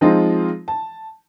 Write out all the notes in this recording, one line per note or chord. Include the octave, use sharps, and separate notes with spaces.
F3 G#3 C4 D#4 F4
A5